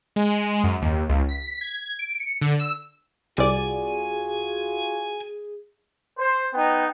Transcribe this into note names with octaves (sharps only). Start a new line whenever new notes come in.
G#3
F#2
D#2
C#2
B6
G#6
D7
C#7
D3
E6
C2 F4 F#4 G#4 D5 G#5
C5
B3 D#4 G5